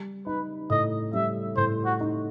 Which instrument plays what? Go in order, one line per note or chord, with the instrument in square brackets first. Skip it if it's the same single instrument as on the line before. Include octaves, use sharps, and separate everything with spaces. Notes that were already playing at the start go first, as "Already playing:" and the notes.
Already playing: [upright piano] G3
[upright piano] D#4 [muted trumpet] B4
[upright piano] A2 [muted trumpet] D#5
[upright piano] G3 [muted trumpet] E5
[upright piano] A2 [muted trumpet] C5
[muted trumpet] F#4
[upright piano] D#4